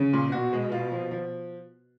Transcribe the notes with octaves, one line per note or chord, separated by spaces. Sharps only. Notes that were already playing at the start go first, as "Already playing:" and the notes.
Already playing: C#3
A#2
B2 F#4
G#3
F4
F3
F3